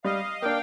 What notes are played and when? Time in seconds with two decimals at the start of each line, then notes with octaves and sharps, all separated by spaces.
0.04 G3 D#5 F5
0.42 A#3 D4 F5 G5